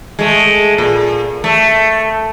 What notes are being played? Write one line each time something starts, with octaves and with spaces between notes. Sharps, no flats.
G#3 A3
A#2
A3